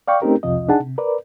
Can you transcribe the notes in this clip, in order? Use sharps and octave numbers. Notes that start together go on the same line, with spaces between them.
D5 F5 G5 C#6
A3 C4 C#4 D#4 G4 A#4
C2 F2 C3 F3 F4 D#5
D4 D#4 G#4 F#5 A5
C3
A#4 B4 D5